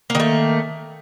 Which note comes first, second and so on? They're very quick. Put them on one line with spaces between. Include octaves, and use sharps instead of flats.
A#3 D#3 A3